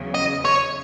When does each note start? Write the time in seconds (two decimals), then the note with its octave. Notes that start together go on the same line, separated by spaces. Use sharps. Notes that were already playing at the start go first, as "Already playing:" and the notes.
Already playing: E2 C#3 F#3
0.14 D#5
0.45 C#5